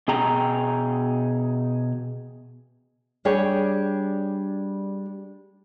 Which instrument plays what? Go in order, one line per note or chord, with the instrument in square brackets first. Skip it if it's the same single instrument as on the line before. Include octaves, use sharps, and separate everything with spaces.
[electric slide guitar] B2 G#4 G5 A#5
[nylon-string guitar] G3 D4 G#4 C#5 G5